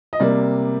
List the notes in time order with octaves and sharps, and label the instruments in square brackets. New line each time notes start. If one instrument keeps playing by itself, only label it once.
[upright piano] D#5
C3 G3 A#3 D5